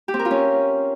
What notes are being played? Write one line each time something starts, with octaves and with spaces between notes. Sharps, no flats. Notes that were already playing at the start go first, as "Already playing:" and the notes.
G4
C4
A#4
F4
C#4